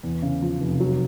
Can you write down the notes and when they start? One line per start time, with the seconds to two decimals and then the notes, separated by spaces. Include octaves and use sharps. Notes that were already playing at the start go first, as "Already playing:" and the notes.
0.03 E2
0.22 C#3
0.42 F3
0.61 F1
0.80 F#3